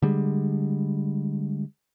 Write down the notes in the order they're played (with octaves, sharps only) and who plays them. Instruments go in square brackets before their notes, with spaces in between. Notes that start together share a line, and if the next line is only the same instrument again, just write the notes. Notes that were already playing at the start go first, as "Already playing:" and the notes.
[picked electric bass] D3 G3 G#3